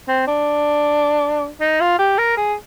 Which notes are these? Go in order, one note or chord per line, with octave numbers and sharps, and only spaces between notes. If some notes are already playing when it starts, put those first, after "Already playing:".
C4
D4
D#4
F4
G4
A#4
G#4